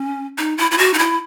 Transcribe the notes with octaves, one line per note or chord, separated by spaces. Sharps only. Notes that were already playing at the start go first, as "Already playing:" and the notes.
Already playing: C#4
D#4
E4
E4
F#4
D#4
E4